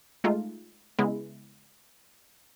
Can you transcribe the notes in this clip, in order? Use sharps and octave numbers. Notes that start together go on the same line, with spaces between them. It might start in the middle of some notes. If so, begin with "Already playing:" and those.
G#3 A3 D#4 F4
C#3 G#3 B3 E4